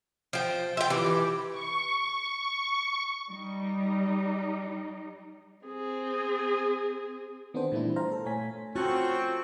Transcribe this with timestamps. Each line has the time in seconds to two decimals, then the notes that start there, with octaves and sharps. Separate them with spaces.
0.33 F3 G5
0.77 F4 E5 G5
0.90 E3 G4
1.52 C#6
1.98 C#6
2.38 C#6
3.29 G3 D#4
5.65 C4 G#4
7.54 D#3 B3 C4 D4 G#4 C5
7.72 A#2 E3 G3 A3 D4 E4
7.96 C5 F5 A#5
8.12 A4
8.25 A#2 A3 C#5 G#5 B6
8.75 A3 C4 C#4 F4 F#4 C#6